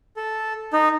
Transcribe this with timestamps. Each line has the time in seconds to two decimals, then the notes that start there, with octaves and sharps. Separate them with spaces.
0.17 A4
0.73 D#4